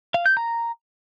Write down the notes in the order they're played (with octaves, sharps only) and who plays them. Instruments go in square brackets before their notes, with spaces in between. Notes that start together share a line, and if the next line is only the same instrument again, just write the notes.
[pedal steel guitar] F5
G6
A#5